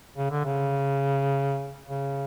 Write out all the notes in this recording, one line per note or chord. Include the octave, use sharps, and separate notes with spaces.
C#3
D3
C#3
C#3